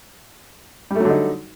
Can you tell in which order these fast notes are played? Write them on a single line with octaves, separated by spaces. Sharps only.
G3 A3 F#3 D3 D#4